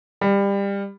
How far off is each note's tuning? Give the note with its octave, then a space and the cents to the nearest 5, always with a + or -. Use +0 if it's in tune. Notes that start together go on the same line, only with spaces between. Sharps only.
G3 +25